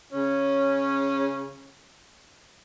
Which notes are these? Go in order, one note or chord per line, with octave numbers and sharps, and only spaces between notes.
C#3 C#4